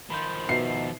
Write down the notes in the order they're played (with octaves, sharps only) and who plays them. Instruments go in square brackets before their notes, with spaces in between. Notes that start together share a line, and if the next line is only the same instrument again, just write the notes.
[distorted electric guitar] D#3 F3 [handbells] B5 C6 G6
[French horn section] B2 [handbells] D#4 E5 [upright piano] C7